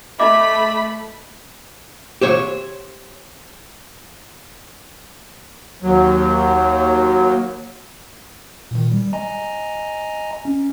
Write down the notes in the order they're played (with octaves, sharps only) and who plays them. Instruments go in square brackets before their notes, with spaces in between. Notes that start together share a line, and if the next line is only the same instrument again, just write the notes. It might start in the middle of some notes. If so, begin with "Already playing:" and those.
[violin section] A3 B5 B6 [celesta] D#5 E5 D6
[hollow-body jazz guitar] G4 C5 C#5
[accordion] D#2 F#3
[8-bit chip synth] A#2 D#3
G3
D#5 G#5 A#5
C#4